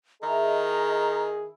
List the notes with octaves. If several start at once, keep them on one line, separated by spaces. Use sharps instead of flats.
D#3 E4 G#4 D#5 A#5